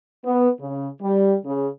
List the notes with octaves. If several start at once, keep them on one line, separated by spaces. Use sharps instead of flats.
B3
C#3
G3
C#3